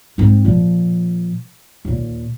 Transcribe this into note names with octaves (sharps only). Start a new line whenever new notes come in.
G#2 C4
A#2 F3
D#2 A#2